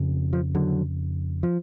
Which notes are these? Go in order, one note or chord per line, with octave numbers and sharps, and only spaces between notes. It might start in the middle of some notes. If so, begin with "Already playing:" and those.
Already playing: F2 C#3
F3
D3 F#3
F3